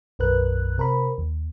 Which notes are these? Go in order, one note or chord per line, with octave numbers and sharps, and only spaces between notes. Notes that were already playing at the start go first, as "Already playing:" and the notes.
B1 F#2 A#4 B4 F#6
C3 A#4 C5 B5
D#2